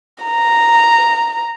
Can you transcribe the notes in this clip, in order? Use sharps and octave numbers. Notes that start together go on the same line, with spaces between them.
A#5